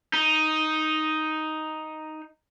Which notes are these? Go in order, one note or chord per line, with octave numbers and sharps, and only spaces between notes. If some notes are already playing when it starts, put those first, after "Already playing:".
D#4